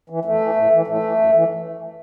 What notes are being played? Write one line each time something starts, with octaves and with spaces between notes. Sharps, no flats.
E3
E2 A3
E3
A2
E3
A2 A3
E3
F#2
E3